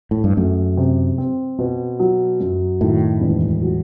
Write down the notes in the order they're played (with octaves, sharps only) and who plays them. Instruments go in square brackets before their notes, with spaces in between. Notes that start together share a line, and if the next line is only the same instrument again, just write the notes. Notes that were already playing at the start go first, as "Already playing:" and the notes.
[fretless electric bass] A2
G2
[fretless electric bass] F#2 [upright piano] A3
[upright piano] C3
C4
B2
F#3
F#2
[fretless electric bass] A2 [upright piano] D#3
[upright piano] E1
F#3